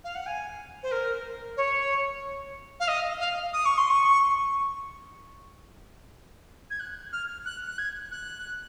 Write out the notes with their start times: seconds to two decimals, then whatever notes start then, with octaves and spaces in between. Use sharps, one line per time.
0.04 F5
0.15 F#5
0.26 G#5
0.83 C5
0.91 A#4
1.57 C#5
2.80 F5
2.88 D#5
3.20 F5
3.53 D#6
3.65 C#6
3.77 C6
3.89 C#6
6.70 G#6
6.80 F#6
7.12 F6
7.45 F#6
7.67 F#6
7.78 G#6
8.11 F#6